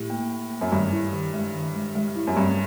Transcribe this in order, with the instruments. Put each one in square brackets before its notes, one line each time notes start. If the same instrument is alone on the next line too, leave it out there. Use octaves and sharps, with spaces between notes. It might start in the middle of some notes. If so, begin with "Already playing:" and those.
Already playing: [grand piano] A2 [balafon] G4
[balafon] A#3
A#3
A#3
[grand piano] F#2
[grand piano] G2 [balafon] D#3
[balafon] E4
D#3
G#3
D#3
G#3
G#3
E4
[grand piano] F#2
[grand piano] G2 [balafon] C4